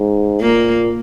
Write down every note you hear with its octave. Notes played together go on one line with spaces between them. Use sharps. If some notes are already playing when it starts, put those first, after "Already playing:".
Already playing: G#2
A#2 A#3